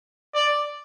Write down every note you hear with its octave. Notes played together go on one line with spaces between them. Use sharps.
D5